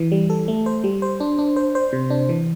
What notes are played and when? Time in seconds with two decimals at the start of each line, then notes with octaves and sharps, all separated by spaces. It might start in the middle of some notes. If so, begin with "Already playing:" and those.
Already playing: E3
0.12 G3
0.30 A4
0.48 A3
0.66 C5
0.84 G3
1.02 C5
1.20 D4
1.39 D4
1.56 C5
1.75 C5
1.93 C3
2.10 D4
2.29 E3